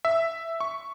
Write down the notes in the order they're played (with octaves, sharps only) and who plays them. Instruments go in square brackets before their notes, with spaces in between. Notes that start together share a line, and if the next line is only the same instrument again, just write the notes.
[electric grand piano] E5
C#6